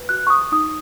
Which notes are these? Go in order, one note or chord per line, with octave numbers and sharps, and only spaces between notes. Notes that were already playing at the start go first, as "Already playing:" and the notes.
Already playing: B4
F#4 F#6
C#6
D#6
D#4 D#6